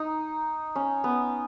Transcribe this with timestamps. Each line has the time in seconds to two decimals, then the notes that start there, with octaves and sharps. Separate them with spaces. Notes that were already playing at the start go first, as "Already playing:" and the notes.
Already playing: D#4
0.76 C#4
1.04 B3